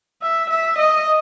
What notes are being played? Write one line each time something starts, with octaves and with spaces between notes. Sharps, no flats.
E5
E5
D#5